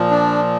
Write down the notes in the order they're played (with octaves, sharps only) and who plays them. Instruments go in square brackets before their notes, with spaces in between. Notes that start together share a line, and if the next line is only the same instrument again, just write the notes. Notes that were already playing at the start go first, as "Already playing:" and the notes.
Already playing: [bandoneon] A#2 F3
D4